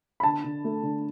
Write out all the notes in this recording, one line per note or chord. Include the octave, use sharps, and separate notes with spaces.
B5
D3 A5
D3
A3
D3